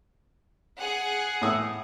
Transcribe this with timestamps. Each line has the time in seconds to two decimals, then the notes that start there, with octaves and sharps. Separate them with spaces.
0.78 G#4 F#5
1.42 A2 D#6 E6